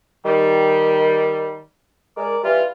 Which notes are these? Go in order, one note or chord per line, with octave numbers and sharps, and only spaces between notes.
D#3 G3
G#3 A#4 D5
E3 G3 F4